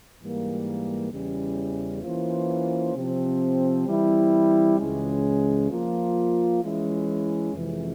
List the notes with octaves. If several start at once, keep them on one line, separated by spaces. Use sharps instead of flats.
G#2 E3 G3 A#3
E2 C#3 E3 G3 C#4
E3 A#3 C#4 F4 C5
C3 F3 C4
E3 G3 C4 E4
C#2 C#3 E3 G#3 C#4
F3 A#3 F4
E3 G#3 C#4 E4
F2 C3 E3 G#3